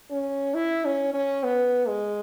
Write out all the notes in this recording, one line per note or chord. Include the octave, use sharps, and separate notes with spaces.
C#4
E4
C#4
C#4
B3
G#3